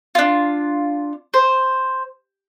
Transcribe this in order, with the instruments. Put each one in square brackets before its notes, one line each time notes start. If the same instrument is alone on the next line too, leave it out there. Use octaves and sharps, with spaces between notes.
[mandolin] D4 F4
C5